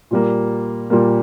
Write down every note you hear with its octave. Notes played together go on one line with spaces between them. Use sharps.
A#2 G3 A#3
A#2 G3 A#3